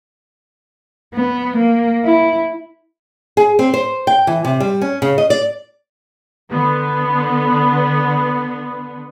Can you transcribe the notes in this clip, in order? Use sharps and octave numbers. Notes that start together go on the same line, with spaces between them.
B3
A#3
E4
G#4
C4
C5
G5
E3
C3
G3
C#4
C#3
D#5
D5
D3 B3